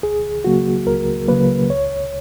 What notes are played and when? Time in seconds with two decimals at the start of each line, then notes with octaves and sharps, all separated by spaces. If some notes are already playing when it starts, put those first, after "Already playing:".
0.03 C#2 G#4
0.44 C#3 F#3 A#3 F#4
0.87 C#2 A#4
1.28 C#3 F#3 A#3 B4
1.70 C#2 C#5